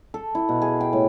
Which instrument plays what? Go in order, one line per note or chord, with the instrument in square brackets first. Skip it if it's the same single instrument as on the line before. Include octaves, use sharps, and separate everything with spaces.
[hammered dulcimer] A4
E4
B2
G#4
G5
A2